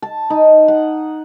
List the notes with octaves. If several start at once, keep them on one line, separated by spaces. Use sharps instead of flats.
A5
D#4
F#5